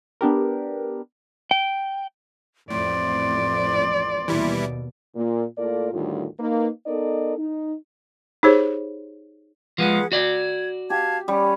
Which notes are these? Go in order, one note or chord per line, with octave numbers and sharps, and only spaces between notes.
B3 D4 G4 A#4
G5
A1 F2 A2 D5 C6
D#2 B2 E3 G3 E4
A#2
A2 A#3 F4 A4 A#4 D5
D2 A2 D#3 G3 F4
A#3 D#4 B4
B3 D#4 A4 A#4 D5 D#5
D#4
D#4 G4 G#4 C5 C#5
F3 G#3 G#4 B4 F#5
F#4 D5 G#6
G4 F5 A5 G#6
G3 C#4